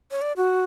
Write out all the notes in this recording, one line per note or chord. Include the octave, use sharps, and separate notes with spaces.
C#5
D5
F#4